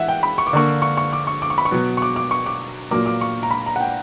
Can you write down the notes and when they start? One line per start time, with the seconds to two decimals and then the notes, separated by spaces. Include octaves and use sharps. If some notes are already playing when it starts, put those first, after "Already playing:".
Already playing: E3 E5 F#5
0.08 G5
0.23 B5
0.38 C#6
0.47 D6
0.53 D3 A#3 C#6
0.82 C#6
0.97 C#6
1.13 D6
1.27 C#6
1.42 D6
1.50 C#6
1.58 B5
1.65 C#6
1.71 B2 F#3 B3
1.97 C#6
2.02 D6
2.16 D6
2.31 C#6
2.46 D6
2.91 A#2 F#3 A#3 D6
3.06 D6
3.21 C#6
3.43 A#5
3.51 B5
3.66 A#5
3.76 F#5
3.81 G5